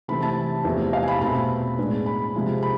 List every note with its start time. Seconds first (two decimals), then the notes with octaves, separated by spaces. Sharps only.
0.08 C3 E3 A3 C4 B5
0.22 A5
0.64 E2 C3 F3 A3
0.93 F5
1.03 G#5
1.08 B5
1.12 A5
1.21 B2 A3 C4 B5
1.78 A2 G#3 B3 D4
2.06 B5
2.34 C3 F3 G#3
2.63 B5